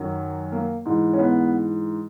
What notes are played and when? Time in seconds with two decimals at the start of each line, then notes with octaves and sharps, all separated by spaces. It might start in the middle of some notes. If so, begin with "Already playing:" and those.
Already playing: F#2 D#3 F#3
0.52 A#3
0.85 G#2 E3
1.13 C#4
1.19 B3